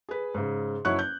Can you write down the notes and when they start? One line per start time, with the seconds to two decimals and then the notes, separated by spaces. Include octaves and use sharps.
0.09 G#4 B4
0.35 G#2 C#3
0.85 F#1 F#3 E4 C#5 C#6 F#6
0.99 G6